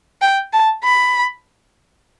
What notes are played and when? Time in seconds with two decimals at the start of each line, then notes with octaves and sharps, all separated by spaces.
0.21 G5
0.53 A5
0.84 B5